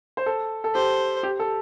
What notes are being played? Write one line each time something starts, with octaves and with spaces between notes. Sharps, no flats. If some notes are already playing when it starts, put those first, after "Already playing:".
C5
A4
A4
G4 C5
G4
A4